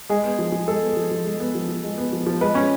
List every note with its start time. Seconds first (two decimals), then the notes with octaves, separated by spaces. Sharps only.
0.09 G#3 G#4
0.24 B3
0.39 F3
0.52 F3
0.68 G#3 A4
0.82 B3
0.97 F3
1.11 F3
1.26 G#3
1.40 B3
1.55 F3
1.69 F3
1.83 G#3
1.98 B3
2.13 F3
2.27 F3
2.41 G#3 B4
2.55 C#4